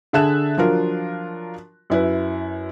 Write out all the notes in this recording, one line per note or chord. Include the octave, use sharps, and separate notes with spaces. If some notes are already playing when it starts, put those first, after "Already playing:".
D3 G#4 E5 A5 F#6 E7
F3 F#3 D4 F4 A#4
F#2 E4 B4